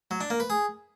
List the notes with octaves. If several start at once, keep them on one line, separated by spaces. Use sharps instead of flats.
F#3
D4
A#3
B4
G#4